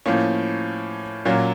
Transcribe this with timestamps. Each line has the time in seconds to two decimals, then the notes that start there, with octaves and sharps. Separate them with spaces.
0.06 A2 F3 A#3 C#4
1.25 A#2 F#3 A#3 C#4